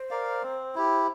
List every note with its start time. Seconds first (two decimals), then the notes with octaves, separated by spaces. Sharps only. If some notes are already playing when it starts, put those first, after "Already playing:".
Already playing: C5
0.10 A#4 D5 F5
0.43 C4
0.75 E4 G4